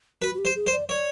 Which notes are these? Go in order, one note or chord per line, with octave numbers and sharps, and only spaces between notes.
F#4 B4
F#4
G4
C5
G#4
C5
D5
C#5 D5